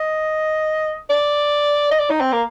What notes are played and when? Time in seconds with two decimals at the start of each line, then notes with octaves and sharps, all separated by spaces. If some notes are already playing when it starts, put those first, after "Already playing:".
Already playing: D#5
1.10 D5
1.91 D#5
1.99 D5
2.10 D#4
2.21 C4
2.32 A#3